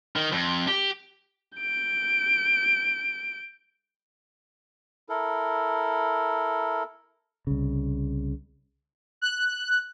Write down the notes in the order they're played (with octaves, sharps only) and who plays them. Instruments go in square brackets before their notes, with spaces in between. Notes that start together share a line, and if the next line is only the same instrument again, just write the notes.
[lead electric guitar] D#3
F2
G4
[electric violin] G6 D7
[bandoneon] E4 A4 A#4
[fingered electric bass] C2 C#3
[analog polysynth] F#6